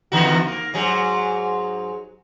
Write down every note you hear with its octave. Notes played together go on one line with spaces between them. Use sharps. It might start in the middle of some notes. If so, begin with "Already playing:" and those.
E2 D3 F#4
A#3
G#2 F#3 G#4